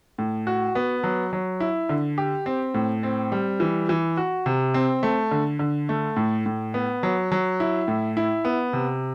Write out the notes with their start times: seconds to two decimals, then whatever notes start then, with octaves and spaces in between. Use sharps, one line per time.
0.18 A2
0.47 F#4
0.75 B3
1.03 F#3
1.33 F#3
1.60 E4
1.89 D3
2.18 G4
2.46 C4
2.74 A2
3.03 C4
3.32 G3
3.60 E3
3.89 E3
4.17 F#4
4.46 C3
4.74 C4
5.03 A3
5.31 D3
5.59 D3
5.89 A3
6.16 A2
6.46 A2
6.74 B3
7.03 F#3
7.32 F#3
7.60 E4
7.88 A2
8.17 E4
8.45 B3
8.73 C3